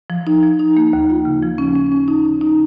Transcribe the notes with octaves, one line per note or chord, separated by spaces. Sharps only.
F3
D#4
F3
D#4
A#3
D#2
F4
C#3
F3
C#4
C#4
C#4
D#4
C#3
D#4